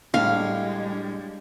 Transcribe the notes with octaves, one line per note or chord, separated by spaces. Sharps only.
A2 G3 G#3 D4 F5